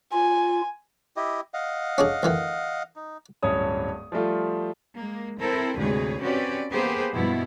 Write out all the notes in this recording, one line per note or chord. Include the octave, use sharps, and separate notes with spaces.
F4 G#5
E4 G4 D#5
D#5 F5 F#5
C#4 D4 G#4
D2 D#3 E3
D#4
D1 G2 C#4 C#5 D#6
F3 G3 A3 F4
G#3 A#3
C4 E4 A4 A#4 C5
D2 G#2 C3 G#4 B4 C#5
C4 C#4 F#4 G4 B4 D5
A#3 B3 G4 G#4 B4 C5
G2 B2 F3 G#3 B3 E4